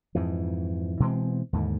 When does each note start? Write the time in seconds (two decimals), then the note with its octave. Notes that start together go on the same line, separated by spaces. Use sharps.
0.15 F2 G#2 E3
1.00 B2 E3 G#3 C4
1.53 D#2 G#2 D3